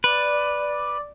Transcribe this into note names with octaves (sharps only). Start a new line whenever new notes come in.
B4 D5